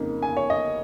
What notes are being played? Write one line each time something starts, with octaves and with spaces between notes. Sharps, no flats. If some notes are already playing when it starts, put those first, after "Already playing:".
Already playing: F2 C#3 A#3 D#4
G#5
C#5
D#5